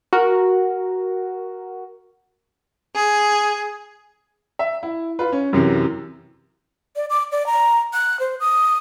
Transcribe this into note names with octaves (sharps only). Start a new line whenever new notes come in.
F#4 A#4
G#4
E5
E4
F4 B4
C#4
F#2 C3 E3
D5
D6
D5
A#5
F#6
C5
D#6